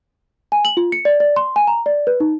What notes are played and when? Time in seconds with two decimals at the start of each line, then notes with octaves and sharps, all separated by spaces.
0.52 G#5
0.65 F#7
0.77 F4
0.92 C#7
1.05 D5
1.20 D5
1.36 C6
1.56 G#5
1.67 A#5
1.86 D5
2.07 B4
2.20 D#4